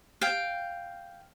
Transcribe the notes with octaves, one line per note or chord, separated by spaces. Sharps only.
F5 G5